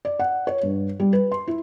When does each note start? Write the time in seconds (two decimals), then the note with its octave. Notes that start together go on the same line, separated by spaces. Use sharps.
0.05 D5
0.19 F#5
0.47 C#5
0.63 G2
1.00 G3
1.13 B4
1.32 C6
1.48 E4